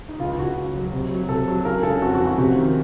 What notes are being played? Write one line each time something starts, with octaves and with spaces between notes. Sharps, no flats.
D#4
C#2 F4
C#2 F#4
C#3
F#3
C3
F#3
C3 A4
F#3
C#3 A#4
C#3 A4
F2 F#4
F#4
C#3
F#4
C3 F#4
D#3